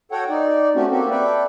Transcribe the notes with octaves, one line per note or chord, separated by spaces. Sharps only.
F#4 A4 C#5 F#5 G5
D#4 D5
A3 C4 C#4 F#4 G4
A#3 C4 F#4 G4 A4
A4 B4 D5 E5 G5